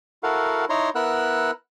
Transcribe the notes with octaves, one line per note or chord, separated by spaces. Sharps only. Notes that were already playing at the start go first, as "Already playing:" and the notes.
E4 F#4 A4 A#4 F5 F#5
D#4 E4 C#5 A#5 C6
B3 E4 A#4 F#5 E6 F#6